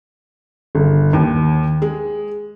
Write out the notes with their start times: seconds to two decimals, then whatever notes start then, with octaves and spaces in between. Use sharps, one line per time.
0.75 G1
1.13 D#2
1.82 G#3